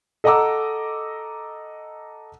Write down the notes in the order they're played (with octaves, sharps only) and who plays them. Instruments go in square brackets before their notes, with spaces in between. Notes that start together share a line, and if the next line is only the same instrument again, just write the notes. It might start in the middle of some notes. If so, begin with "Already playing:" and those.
[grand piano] A4 D#5 F#5 A#5 D6 E6